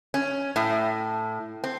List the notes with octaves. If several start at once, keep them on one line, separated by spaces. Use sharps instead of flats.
C#4
A2
C4